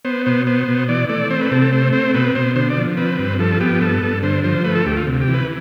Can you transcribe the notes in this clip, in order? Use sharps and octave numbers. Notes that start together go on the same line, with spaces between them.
B3 C5
B2 C5
B3 C5
B2
E3 D5
A3 D5
C4 C5
B4
C3 A4
A4
A3 C5
C4 C5
B2 B4
B2 C5
D3 C5
D5
F3
C4 B4
G2
F3 A4
B3 G4
G2 A4
G2
D3 C5
F3 C5
A3 B4
A4
D2 G4
F4
C3
G4
E3
B4